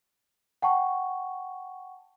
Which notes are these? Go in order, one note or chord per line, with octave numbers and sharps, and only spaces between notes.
F#5 G5 A5 C#6